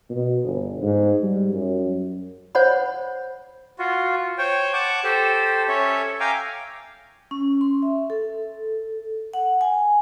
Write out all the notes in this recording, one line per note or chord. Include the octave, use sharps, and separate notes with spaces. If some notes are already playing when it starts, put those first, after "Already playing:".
B2
G1
G#2
G3
F#2
C5 C#5 F#5 B5
F4 F#4
C5 C#5 G5
F#5 A5 C#6 D6
G4 A4 C5
C#4 A4 C#5 E5
E5 F5 G5 G#5 A#5 D6
C#4
C6
E5
A4
F#5
G#5